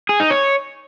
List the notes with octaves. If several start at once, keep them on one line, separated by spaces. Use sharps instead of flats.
G#4
D#4
C#5